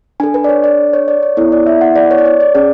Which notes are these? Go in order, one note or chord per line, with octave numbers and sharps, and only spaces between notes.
D4 A4 G#5
B4
D5
C#5
D5
C#5
D5
C#5
B3 E4 A4 C#5
D5
E5
F#5
D5
C#5
D5
C#5
D5
C#4 G#4 D5